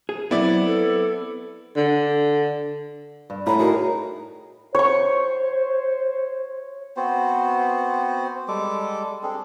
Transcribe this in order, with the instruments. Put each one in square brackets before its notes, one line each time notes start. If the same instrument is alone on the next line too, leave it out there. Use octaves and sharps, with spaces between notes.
[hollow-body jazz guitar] G#4
[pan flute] F#3 [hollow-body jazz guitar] B3 C4 B4 [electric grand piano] E4 D5
[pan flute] A4
[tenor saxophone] D3
[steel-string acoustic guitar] G2
[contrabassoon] A2 [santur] A#5 [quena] B5
[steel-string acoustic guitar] D#4 G#4 A#4 [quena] F#4
[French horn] C5 [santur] C#5 C#6
[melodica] B3 C4 F#4 C5
G3 G#3 A4 D6
C4 D4 G#4 A4